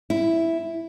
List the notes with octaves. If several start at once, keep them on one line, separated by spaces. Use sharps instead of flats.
E4